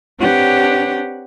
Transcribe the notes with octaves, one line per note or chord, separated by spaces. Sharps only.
C4 D4 G4 B4 C#5 F#5